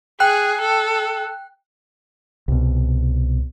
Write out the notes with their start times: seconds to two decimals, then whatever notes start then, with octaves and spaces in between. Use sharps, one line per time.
0.20 G#4 G5 F#6
0.61 A4
2.48 C2 B2